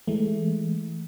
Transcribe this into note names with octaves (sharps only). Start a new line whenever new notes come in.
E3 G#3 A3